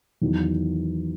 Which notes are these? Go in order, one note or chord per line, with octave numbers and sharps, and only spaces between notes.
E2 D#3 F#3